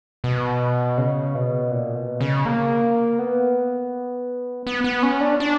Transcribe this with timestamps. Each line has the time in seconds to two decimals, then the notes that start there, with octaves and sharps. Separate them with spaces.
0.24 B2
0.98 C#3
1.35 B2
1.71 A#2
1.95 B2
2.21 C#3
2.45 A#3
3.19 B3
4.67 B3
4.84 B3
5.03 C#4
5.21 D4
5.40 D4